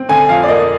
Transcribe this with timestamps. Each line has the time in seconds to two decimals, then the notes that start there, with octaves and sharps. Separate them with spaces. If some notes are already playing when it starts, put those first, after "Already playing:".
Already playing: C4
0.09 D3 G#5
0.29 F2 F5
0.44 D5
0.48 A#3 D#5